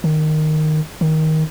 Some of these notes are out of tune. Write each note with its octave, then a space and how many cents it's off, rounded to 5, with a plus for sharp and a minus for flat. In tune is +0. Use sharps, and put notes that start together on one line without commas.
D#3 -10
D#3 +15